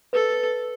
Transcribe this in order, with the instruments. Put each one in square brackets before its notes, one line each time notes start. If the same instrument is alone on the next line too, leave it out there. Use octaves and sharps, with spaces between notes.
[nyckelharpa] A4 [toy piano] B4